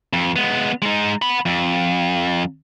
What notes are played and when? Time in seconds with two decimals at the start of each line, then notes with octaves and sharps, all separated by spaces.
0.13 F2
0.36 G#3 B3
0.82 G#3 D#4
1.22 F#5 B5
1.46 F2